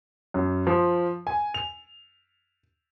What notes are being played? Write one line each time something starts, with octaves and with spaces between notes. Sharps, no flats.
F#2
F3
G#5
F7